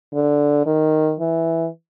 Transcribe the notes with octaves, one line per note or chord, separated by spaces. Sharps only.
D3
D#3
E3